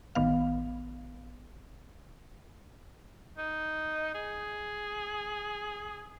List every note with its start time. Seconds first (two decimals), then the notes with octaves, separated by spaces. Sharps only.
0.15 A1 D#3 B3 F5
3.38 D#4
4.14 G#4